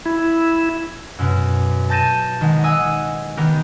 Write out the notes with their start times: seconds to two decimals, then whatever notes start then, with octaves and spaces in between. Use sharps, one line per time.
0.06 E4
1.19 F#2 B2
1.89 A5 G6 A6 A#6 D#7 E7
2.41 D#3 G#3 F#5
2.64 D#5 F#5 G#5 D#6 E6
3.37 D#3 B3 G4 A#4